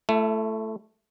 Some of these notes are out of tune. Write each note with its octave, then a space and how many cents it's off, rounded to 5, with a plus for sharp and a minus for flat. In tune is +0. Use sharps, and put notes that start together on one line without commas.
A3 +0 E4 +35